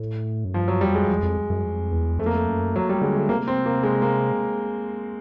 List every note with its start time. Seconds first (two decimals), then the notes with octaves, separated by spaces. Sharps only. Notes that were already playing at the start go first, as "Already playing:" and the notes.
Already playing: A2
0.45 F#2
0.54 G2 F3
0.68 F#3
0.81 F2 G3
0.95 G#3
1.04 F#2
1.09 F2
1.23 F2
1.50 F#2
1.64 F2
1.92 E2
2.19 F2 A3
2.26 A#3
2.34 A3
2.47 F#2
2.76 F#3
2.89 G3
3.01 D3 G#3
3.16 A3
3.29 C3 A#3
3.48 C4
3.66 A#3
3.83 G#3
4.02 A#3